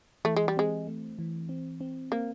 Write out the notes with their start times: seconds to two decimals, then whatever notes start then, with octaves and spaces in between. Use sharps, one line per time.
0.25 E3 A3
0.36 G#3
0.48 G3
0.57 G#3 C4
0.87 A3
1.19 E3
1.49 C4
1.81 C4
2.12 A#3 C4